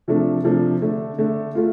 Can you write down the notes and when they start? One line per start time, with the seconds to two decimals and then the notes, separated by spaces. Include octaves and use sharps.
0.08 C3 F3 A3 D4
0.44 C3 F3 A3 D4
0.81 D3 A3 D4
1.18 D3 A3 D4
1.55 A3 F4